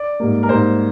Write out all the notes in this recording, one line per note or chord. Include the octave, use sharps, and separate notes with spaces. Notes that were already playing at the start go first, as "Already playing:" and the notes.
Already playing: D5
G#2 G3 A#3
A#4
G#2 G3 A#3 C5